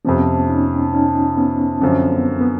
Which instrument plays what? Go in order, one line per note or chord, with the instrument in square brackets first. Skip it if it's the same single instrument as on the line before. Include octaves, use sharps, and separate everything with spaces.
[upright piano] F2 C3 F3 [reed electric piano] B3 C#4
[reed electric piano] C#4 D#4
C#4 D#4
B3 C#4
[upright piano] F#2 D3 F3 [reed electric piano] C4
[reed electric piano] B3
B3